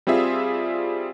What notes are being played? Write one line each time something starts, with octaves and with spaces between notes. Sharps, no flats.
G3 C4 F4 G#4 E5